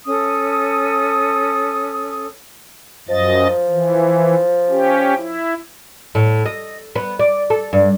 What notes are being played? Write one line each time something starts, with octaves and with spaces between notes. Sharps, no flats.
C#4 A4 D#6
F#2 F3 D#5 A6
E3
C#4 G4
E4
A2
D#5
B3
D5
A4
G2